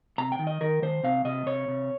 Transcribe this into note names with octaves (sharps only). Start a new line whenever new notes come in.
C3 A#5
G5
D#3
D#5
D#3 A#4
D#3 C5
C3 F5
C3 D#5
C3 C#5
C3